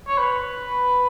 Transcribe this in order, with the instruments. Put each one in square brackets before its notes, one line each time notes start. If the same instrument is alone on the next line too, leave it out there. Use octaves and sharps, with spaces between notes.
[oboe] C#5
B4